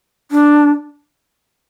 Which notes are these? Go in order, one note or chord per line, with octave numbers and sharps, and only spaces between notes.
D4